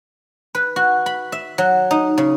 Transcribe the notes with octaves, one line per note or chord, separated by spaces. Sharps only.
B4
F#4
B5
E5
F#3
D#4
C#3